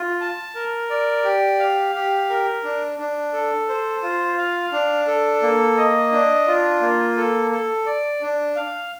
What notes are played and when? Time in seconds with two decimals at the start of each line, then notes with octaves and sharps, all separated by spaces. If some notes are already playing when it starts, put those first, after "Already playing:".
Already playing: F4
0.21 A5
0.55 A#4
0.90 D5
1.24 G4
1.59 F5
1.95 G4
2.30 A#4
2.64 D4
2.99 D4
3.33 A4
3.69 C5
4.03 F4
4.38 F5
4.72 D4
5.07 A4
5.42 A#3
5.77 D#5
6.12 D4
6.47 F4
6.81 A#3
7.17 A4
7.51 A4
7.86 D5
8.21 D4
8.56 F5